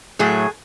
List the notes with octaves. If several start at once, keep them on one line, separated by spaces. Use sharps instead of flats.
A2 F#3 A3 G#4